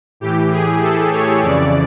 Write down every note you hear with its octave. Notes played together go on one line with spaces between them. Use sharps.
A2 E3 G4
G#4
A4
C#5
F2 C#3 E3 D5